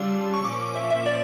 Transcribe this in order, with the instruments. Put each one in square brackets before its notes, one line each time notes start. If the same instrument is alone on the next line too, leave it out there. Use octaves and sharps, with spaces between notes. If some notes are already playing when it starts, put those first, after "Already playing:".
Already playing: [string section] C#3 G3 D4 F4 [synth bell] E6
[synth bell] C#6
[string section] A#2 F3 C#4 [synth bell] D6
[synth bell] E5
E5
D5